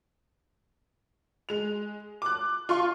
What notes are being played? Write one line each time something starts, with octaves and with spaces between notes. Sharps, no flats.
G#3 F7
D6 F#6
F4 C6 C#6